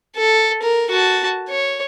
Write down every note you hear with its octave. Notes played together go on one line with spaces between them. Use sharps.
A4
A#4
F#4 A5
C#5